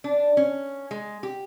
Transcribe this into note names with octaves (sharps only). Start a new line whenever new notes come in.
D4
C#4
G#3
G4